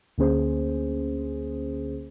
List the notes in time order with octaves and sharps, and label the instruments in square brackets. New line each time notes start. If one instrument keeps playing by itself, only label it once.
[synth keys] D2 D3 A#3 C#4 G#4 C5